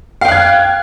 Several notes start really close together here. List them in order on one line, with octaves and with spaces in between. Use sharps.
F5 G5 F#6 G#6